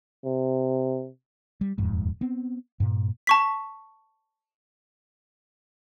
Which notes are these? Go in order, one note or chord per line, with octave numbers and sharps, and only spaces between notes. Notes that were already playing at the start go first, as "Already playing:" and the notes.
C3
G3
D#1 F2 G#2
B3 C4
G2 A#2
A5 C#6 B6